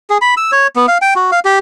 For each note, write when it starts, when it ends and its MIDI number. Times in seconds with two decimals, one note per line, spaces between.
0.10 0.18 68
0.21 0.35 83
0.37 0.51 88
0.52 0.67 73
0.76 0.86 59
0.88 0.98 77
1.02 1.14 79
1.16 1.31 66
1.32 1.40 77
1.45 1.59 67